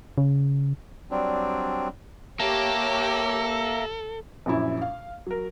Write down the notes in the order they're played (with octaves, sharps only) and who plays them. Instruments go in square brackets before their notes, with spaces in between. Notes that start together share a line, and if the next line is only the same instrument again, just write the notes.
[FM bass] C#3
[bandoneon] F#3 G3 C4 D4
[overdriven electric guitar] A#3 [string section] G4 C#5 [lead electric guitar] A4 [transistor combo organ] E5 A#5
[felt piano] A#1 F#2 E4
F5
F#3 A#4